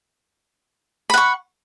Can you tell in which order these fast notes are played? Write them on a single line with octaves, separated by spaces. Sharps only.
B5 F#5 C#6